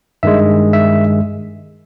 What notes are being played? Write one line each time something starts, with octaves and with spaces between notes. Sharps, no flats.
G2 D#3 G#3 E5
E5